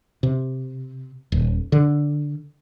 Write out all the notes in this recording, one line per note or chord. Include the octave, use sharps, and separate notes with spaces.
C3
D#1
D3